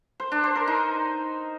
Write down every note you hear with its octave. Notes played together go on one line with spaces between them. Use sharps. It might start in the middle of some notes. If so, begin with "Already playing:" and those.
C5
D4
C5
A#4
D#4